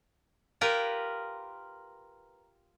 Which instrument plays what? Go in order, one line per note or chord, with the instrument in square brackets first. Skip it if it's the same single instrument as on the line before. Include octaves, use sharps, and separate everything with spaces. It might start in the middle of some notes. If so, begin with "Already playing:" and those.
[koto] F4 G4 A#4 B4